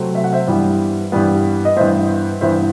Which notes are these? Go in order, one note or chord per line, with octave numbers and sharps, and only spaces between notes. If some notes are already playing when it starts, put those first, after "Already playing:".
Already playing: C3 F#3 A3 C4
E5
F#5
C5 E5
G2 E3 G3 B3
G2 E3 G3 B3
D#5
G2 E3 B3 C5 E5
G2 E3 B3 C5 E5